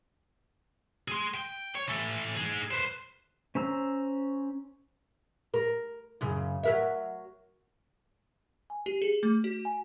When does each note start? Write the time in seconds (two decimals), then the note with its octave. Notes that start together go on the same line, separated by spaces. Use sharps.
1.08 G#4 C6
1.34 G5
1.75 C#5
1.88 E3 A4
2.37 D#4 G#4
2.71 B4 C5
3.55 C#4 C5 A#5 E6
5.54 A#4
6.21 F#2 C#3
6.63 F#3 A#4 E5
8.70 G#5
8.86 G4
9.02 G#4
9.23 A3
9.44 F#4
9.65 G#5